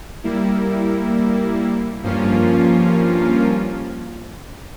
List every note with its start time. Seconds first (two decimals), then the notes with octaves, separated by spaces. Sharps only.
0.24 G3 A#3 E4
2.03 G2 F3 A#3 C#4 F4